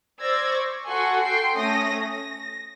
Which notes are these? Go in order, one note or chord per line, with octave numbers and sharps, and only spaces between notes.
C5 D5 E6 G#6 A#6
C#6
F#4 A4 F#5 G#5 C6 C#6
A4 G5 C6 C7
A3 C#4 D#6 A#6
A#6